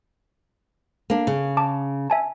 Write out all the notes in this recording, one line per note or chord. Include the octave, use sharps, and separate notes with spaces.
A#3 D4
C#3
A5 D6
E5 G#5 A5